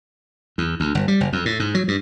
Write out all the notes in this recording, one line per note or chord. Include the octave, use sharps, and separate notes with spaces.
E2
D2
G1
G3
F#1
F2
A2
G#2
F#3
G2